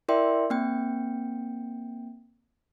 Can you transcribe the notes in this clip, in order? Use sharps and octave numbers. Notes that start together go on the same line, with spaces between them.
E4 A#4 D5 E5 G5 C6
A#3 C4 G5